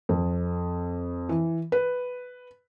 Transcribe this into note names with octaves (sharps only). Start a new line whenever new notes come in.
F2
E3
B4